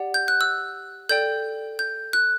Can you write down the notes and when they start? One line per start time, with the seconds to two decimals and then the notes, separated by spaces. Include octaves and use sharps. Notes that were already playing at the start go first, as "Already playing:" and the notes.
Already playing: G4 D5 F#5
0.14 G6
0.28 F#6
0.41 E6
1.09 A4 D5 G5 G6
1.79 G6
2.13 F#6